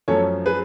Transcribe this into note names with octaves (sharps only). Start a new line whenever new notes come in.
F#2 F3 A3 C#4 A4 C#5
G#4 B4